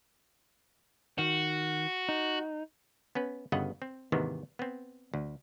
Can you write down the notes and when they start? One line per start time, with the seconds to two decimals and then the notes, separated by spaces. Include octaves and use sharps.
1.18 D#3 F#4
2.09 D#4
3.15 B3 C#4 B4
3.52 G1 G2 C#3 B3 D#5 F#5
3.82 C4
4.12 D#2 G#2 C3 D#3 E3 B3
4.59 B3 C4
5.14 D2